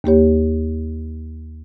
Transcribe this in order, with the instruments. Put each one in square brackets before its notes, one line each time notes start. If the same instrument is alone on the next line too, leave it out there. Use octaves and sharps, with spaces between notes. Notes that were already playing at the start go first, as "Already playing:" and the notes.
[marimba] D#2 A#3 G4 C#5